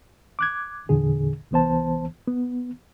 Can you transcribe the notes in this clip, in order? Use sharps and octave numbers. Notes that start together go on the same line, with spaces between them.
D6 F#6 G#6
E2 A#2 D3 G#4
C2 E3 B3 C5 A5
B3